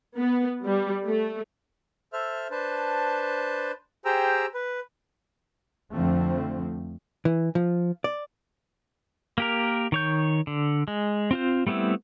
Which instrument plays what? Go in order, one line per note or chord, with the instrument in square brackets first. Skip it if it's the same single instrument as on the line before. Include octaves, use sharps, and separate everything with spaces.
[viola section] B3
G3
A3
[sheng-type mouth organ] A4 C5 E5 F6
D4 B4 C5 A5
G4 G#4 C5 G5 A#5 E6
B4
[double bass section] F2 D3 F3 A3 C4
[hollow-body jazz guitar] E3
F3
D5
[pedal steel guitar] A#3 G4 A#4
D#3 C#5 G6
D3
G#3
C4 F4 C5
G3 A3 B3 C4 E4